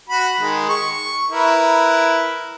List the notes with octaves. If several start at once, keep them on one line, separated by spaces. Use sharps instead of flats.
F#4 B5
D#3 G#3
C#6
E4 A#4 B4